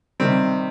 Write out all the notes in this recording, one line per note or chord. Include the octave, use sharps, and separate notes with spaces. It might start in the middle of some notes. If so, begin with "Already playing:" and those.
C3 D#3 G3 C4